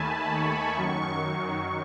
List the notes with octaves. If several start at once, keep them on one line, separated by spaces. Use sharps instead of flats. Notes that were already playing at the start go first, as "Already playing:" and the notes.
Already playing: D#2 D#3 A3 G#5 A5 B5
C#6
F#2 D#3 F#3